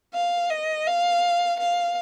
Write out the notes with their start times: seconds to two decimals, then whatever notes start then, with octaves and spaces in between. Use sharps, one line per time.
0.13 F5
0.50 D#5
0.87 F5
1.60 F5